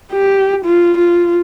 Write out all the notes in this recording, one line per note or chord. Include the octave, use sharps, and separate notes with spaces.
G4
F4
F4